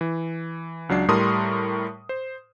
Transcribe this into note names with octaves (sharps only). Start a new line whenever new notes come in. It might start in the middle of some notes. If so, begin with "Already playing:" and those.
E3
C#2 F#3 D4 C7
A2 G3 A#4 A5 C6 D#6
C5